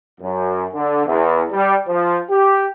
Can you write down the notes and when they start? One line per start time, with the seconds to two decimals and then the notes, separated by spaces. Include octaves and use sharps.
0.21 F#2
0.74 D3
1.06 E2
1.51 G3
1.87 F3
2.30 G4